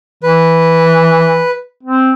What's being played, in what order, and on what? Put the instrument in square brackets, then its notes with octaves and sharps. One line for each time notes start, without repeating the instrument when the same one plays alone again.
[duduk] E3 [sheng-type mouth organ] B4
[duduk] C4